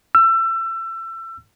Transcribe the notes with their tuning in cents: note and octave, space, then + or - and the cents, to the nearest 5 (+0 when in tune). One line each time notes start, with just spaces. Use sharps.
E6 +30